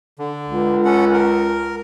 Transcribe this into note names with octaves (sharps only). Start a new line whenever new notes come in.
D3
C#2
C#4 A4 F#5
A#4